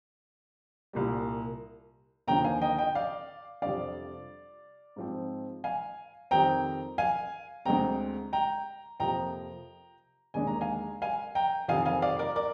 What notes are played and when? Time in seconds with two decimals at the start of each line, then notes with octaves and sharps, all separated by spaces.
0.93 C2 A#2 G3
2.27 D#2 D3 F3 G5 A#5
2.44 F5 G#5
2.61 D#5 G5
2.78 D#5 G5
2.95 D5 F5
3.62 F2 C3 G3 D4 D5 F5
4.96 G#2 F3 C4
5.64 F5 G#5
6.31 F2 D#3 G3 C4 G5 A#5
6.98 F5 G#5
7.65 D2 D3 G#3 C4 G5 A#5
8.33 G5 A#5
9.00 F2 C3 F3 A#3 G5 A#5
10.34 D#2 D3 G#3 D4 G#5
10.47 A#5
10.61 F5 G#5
11.02 F5 G#5
11.35 G5 A#5
11.68 F2 C3 D#3 F5 G#5
11.85 F5 G#5
12.02 D5 F5
12.19 A#4 D5
12.36 A#4 D5